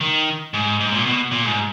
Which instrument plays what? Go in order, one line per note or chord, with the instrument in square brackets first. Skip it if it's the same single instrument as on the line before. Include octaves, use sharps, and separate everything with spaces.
[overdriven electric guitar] D#3
G#2
G#2
A#2
B2
A#2
G#2